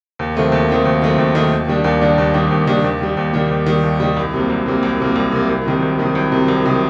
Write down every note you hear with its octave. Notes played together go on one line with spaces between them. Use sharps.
D#2
D#3 F#3 A3 C4
D#2
D#3 F#3 A3 C4
D#2
D#3 F#3 A3 C4
D#2
D#3 F#3 A3 C4
D#2
D#3 G3 D4
D#2
D#3 G3 D4
D#2
D#3 G3 D4
D#2
D#3 G3 D4
D#2
D#3 G3
D#2
D#3 G3
D#2
D#3 G3
D#2
D#3 G3
C2
C3 F#3 A#3
C2
C3 F#3 A#3
C2
C3 F#3 A#3
C2
C3 F#3 A#3
C2
C3 D#3 F#3
C2
C3 D#3 F#3
C2
C3 D#3 F#3
C2
C3 D#3 F#3